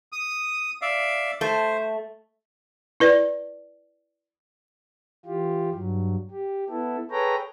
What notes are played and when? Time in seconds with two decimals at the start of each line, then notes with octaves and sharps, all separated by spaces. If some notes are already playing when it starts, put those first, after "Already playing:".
0.12 D#6
0.82 D5 E5 F5
1.41 A3 C5
3.00 E4 B4 D5
5.26 E3 F4 G4
5.74 G2 F#3
6.31 G4
6.70 B3 E4 A4
7.11 G#4 A4 B4 C#5 G5 A#5